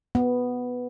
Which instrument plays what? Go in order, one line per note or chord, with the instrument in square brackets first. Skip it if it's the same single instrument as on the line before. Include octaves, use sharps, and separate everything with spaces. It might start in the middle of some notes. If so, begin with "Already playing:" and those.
[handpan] B3